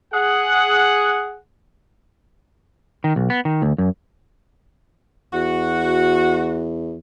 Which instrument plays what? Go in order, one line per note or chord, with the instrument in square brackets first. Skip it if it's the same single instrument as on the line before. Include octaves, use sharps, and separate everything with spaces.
[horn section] G#4 F#5
[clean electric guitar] D#3
B1
B3
D#3
D2
F#2
[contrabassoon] E2 [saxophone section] F#4